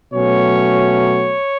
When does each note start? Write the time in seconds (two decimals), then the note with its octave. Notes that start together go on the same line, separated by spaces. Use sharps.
0.13 B2 F#3 A3 C#4 C#5